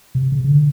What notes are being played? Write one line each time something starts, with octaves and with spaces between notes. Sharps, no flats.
C3
C#3
C#3
D3